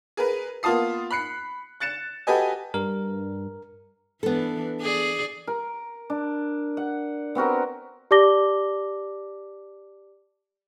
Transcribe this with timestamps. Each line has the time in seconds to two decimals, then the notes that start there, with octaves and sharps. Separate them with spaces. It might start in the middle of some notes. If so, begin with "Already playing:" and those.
0.17 G#4 A#4 B4
0.63 A#3 B3 F4 A5 D#6 C7
1.11 B5 F#6 C7 C#7
1.80 F#6 A6 C#7 E7
2.27 F#4 G4 A4 B4 D#5 G#5
2.74 G2 A#4
4.23 E3 B3 D4 A4
4.81 G#4 D5
5.47 A#4
6.10 D4
6.77 F#5
7.35 B3 C4 F#4 A#4
8.11 G4 D5 A5 D6 A#6 G7